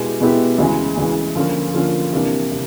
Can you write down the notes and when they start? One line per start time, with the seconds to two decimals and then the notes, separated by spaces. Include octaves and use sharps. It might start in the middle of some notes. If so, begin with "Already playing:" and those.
Already playing: B2 G#3 B3 E4 G4
0.20 B2 G#3 B3 E4 G4
0.58 D2 C#3 E3 G#3
0.97 D2 C#3 E3 G#3
1.36 D3 F3 A#3 C#4 F4
1.74 D3 F3 A#3 C#4 F4
2.13 C3 E3 G3 A#3 D4
2.51 C3